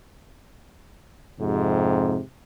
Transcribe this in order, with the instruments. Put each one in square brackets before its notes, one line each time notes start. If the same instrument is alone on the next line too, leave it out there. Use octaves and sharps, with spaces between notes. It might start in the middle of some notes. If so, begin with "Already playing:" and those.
[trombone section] F2 G#2 C3